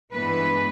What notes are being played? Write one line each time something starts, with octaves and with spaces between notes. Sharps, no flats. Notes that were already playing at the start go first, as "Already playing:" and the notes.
G2 E3 G#3 B3 B4